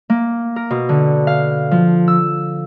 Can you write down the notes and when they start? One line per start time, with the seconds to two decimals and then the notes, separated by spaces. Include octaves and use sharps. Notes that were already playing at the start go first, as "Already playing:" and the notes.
0.10 A#3
0.56 A#4
0.71 B2
0.89 D3
1.27 F5
1.71 F3
2.08 E6